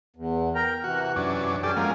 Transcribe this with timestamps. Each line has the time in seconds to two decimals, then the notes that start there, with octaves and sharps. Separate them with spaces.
0.16 E2
0.55 A#4 G5 A#5
0.84 C3 E3 F#4
1.16 F#2 C#4 D4
1.63 F#3 C#4 G4 A4 D5 G#5
1.77 F3 G#3 A#3